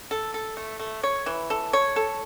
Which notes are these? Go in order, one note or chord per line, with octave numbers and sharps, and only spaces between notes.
A4
A4
A3
A3
C#5
E3
A4
C#5
A4